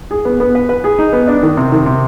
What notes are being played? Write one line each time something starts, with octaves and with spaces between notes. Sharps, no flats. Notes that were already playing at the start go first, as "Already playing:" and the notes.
G#4
B3
B3
B4
B4
G#4
D#4
B3
D4
D#3
C3
D#3
C3